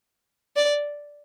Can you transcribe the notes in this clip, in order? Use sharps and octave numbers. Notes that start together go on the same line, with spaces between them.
D5